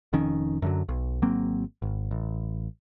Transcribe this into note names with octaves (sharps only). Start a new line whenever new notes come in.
F1 F2 D#3 C#4
F#2 D3 F#3
B1
G#1 F#3 A#3 C4
G#1
A1